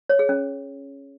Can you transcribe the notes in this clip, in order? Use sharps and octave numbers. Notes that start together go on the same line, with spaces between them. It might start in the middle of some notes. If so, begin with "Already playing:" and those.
C#5
G#4
C#4